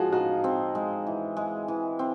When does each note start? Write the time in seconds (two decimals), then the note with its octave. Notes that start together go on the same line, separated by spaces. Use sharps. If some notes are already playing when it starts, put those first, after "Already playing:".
Already playing: F3 G#3 F4 F#4 G#4
0.12 D#4 F#4
0.44 C4
0.75 G#3
1.07 E3
1.37 G#3
1.68 E3
1.99 C4